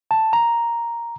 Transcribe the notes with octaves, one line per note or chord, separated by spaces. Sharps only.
A5
A#5